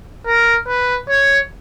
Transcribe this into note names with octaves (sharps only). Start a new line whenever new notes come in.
A#4
B4
C#5